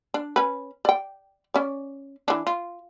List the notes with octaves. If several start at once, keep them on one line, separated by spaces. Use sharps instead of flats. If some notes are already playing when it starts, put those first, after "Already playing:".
D4
C#4 B4
D5 G5
C#4 D5
E3 D4
F4